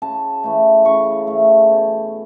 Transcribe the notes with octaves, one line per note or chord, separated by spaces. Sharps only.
C#3 A5
E3 A3
C#3 C#6
E3 A3
B2